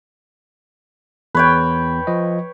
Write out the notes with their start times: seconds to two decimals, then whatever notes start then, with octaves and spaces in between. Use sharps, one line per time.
1.35 E2 B4 C#5 G5
2.07 F3 D#5